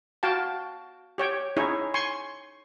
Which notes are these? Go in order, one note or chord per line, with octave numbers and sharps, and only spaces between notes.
F#4 F5 G5 A5
G4 C#5 G5
C#4 D#4 E4 G#4 C#5
G#5 C6 C#6